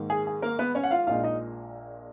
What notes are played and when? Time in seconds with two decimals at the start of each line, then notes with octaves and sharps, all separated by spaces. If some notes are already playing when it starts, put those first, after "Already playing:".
Already playing: G#2 D#3 A#3
0.10 G#4
0.27 G#4
0.42 A#3 A#4
0.59 B3 B4
0.75 C#4 C#5
0.84 F#5
0.91 F4 F5
1.07 A#1 A#2 G#3 D#4 F4 F5
1.23 D#4 D#5